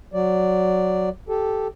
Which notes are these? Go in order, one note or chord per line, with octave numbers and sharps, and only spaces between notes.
F#3 D5
G4 A4